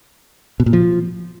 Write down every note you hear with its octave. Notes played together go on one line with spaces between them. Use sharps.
B2
A#2
F3